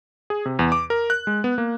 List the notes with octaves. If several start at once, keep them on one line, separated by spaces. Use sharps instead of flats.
G#4
C3
E2
D6
A#4
F#6
G#3
B3
A#3